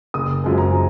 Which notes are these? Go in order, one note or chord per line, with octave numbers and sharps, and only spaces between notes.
F#1 D#6
F#2 F3 G#3 G#5
A#5
G#5